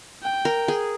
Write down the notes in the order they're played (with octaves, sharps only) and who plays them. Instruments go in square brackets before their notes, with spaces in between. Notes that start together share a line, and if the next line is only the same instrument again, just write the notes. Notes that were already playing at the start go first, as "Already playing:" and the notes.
[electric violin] G5
[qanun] A#4
G#4